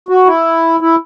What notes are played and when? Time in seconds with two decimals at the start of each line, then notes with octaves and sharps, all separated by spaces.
0.09 F#4
0.26 E4
0.80 E4